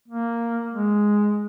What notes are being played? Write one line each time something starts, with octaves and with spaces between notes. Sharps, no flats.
A#3
G#3